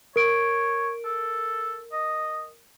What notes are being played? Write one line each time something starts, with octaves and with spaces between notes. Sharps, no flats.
A#4 C#5 D7
A4
D#5